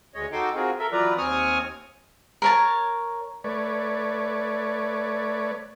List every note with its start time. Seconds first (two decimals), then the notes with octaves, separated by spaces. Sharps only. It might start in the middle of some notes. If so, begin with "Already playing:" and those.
0.14 D2 G#3 C#5 D#5
0.32 D#4 F#4 A4 G5 C6 D6
0.55 C4 F4 F#4 G#4 A#4
0.79 A4 A#4 E5
0.92 E3 F#3 F4 B4 D5 A#5
1.18 D#2 C4 G#5 C#6 D#6 F6
2.42 A#4 C#5 A5
3.44 A3 B4 C#5 D5